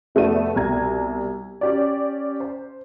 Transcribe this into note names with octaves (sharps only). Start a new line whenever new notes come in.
F1 A3 B3 D5 D#7
C2 B2 A#5 G#6
C#4 G4 D5
C5